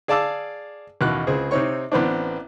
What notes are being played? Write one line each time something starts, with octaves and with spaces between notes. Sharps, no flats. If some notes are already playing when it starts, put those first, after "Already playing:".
G#4 D5 F5 A5 D6 E6
A1 D#2 B2 F#6
C#2 C4 G#4
C3 C4 D#4 C#5 C#6
A1 B3 C4 D4